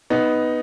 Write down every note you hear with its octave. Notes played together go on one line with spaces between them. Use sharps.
B3 D#4